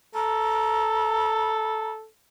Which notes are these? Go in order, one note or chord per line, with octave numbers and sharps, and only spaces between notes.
A4 A#5